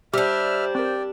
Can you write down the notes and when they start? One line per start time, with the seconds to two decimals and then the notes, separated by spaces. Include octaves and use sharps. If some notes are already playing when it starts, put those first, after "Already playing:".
0.14 G3 D4 G4 C5 E5 F6
0.75 C4 A#4 D5 G5